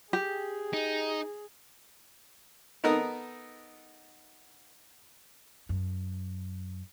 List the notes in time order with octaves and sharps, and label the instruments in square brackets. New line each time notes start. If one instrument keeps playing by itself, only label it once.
[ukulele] G4 [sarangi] G#4
[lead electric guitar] D#4
[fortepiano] B3 D#4 A4 A#4
[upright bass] F#2